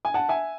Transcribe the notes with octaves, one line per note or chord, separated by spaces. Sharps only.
G#5
F#5 A5
E5 G#5